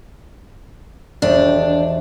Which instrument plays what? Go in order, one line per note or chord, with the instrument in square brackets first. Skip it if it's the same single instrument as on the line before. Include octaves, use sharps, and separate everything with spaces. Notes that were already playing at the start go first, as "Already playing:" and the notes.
[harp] E1 G4 [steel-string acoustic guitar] D4